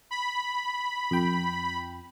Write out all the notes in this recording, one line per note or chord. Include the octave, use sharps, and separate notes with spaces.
B5
F2 G5